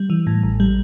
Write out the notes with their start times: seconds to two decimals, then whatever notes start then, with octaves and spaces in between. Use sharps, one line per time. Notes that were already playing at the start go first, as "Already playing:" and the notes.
Already playing: G3
0.10 E3
0.27 A2
0.43 A1
0.60 G3